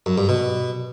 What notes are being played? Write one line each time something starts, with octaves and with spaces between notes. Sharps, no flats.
F#2
G2
B2